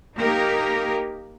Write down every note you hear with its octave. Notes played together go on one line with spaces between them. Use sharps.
A#3 D#4 G4 A#4